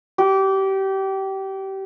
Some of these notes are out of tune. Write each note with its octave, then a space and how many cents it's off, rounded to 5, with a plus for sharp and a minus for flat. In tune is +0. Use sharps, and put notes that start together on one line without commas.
G4 -25